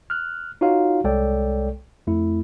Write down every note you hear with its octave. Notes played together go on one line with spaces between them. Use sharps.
F6 F#6
D#4 F4 F#4 C#5 F5
C2 G#3 A4 C#5 D5 G5
F2 A3 E4